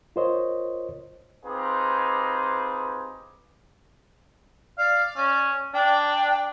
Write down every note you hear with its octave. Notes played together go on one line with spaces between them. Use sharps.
F4 A#4 C5 C#5 D#5
C4 D#4 F4 G4 G#4 B4
D5 F5
C#4
D4 G5